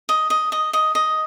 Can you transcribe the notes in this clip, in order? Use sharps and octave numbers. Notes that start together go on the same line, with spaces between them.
D#5
D#5
D#5
D#5
D#5